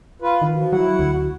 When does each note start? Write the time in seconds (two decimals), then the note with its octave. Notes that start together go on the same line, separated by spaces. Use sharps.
0.22 F4 B4
0.42 D#3
0.54 F3 F#4
0.73 F#3 E4 F#5
0.99 D2